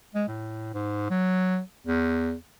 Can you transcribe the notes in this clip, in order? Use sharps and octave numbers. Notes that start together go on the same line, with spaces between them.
G#3
A2
G#2
F#3
E2